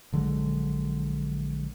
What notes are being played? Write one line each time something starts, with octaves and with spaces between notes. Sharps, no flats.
A#1 D3 F#3 G#3